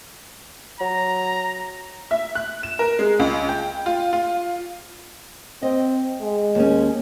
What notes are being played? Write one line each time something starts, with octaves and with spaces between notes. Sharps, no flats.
F#3 A#5
E5
F#6
E7
A#4
G#3
C#2
G5
F4
F4
C4 D#5
G#3
D#2 C#4